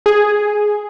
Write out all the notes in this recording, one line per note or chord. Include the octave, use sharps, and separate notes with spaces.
G#4